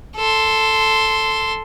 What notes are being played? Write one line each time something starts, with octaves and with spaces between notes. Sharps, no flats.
A4 C6